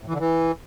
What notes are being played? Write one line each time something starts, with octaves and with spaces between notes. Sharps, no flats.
A2
E3
D3
E3